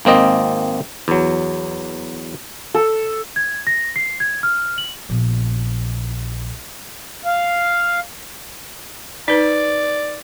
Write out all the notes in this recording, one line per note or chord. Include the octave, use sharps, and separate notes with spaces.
G#1 A#3 C4 D#5
E2 F#3
A4
G#6
A#6
C7
G#6
F6
F#7
A#1 B3
F5
D#4 B4 D5